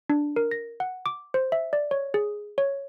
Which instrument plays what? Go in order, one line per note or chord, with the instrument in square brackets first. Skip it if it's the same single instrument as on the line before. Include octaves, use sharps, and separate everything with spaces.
[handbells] D4
A#4
A#6
F#5
D6
C5
E5
D5
C#5
G#4
C#5